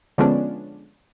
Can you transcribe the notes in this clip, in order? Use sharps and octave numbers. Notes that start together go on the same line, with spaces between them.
D3 F3 G#3 B3 C#4 D4